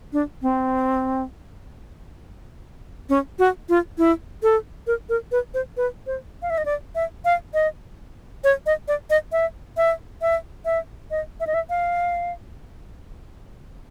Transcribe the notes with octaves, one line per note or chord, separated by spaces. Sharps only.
D4
C4
C#4
F#4
F4
E4
A4
A#4
A#4
B4
C5
B4
C5
F5
E5
D#5
D5
E5
F5
D#5
C#5
D#5
D5
D#5
E5
E5
E5
E5
D#5
E5
D#5
E5
F5